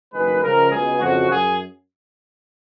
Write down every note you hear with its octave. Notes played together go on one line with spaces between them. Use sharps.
F#1 F#2 D#3 G#3 B4
C#2 C#3 F3 G#3 A#4
C#2 B2 G#3 G#4
F2 C#3 F3 F#4
F#2 G#4